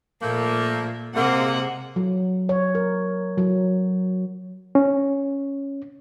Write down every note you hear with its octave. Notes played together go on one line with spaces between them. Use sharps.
A#2 F3 A3 A#3
C3 G#3 A#3 F#5
F#3
C#5
A#4
F#3
C#4